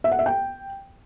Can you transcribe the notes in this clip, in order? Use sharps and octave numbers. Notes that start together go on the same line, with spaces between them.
E5
F#5
E5
G5